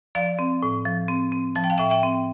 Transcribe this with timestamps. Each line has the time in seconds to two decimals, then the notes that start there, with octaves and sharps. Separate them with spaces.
0.15 F3 D5 F5
0.39 C4
0.62 A2
0.85 F3
1.08 C4
1.32 C4
1.55 F3 A5
1.64 G5
1.70 F5
1.78 A2 E5 G5
1.90 E5 G5
2.03 C4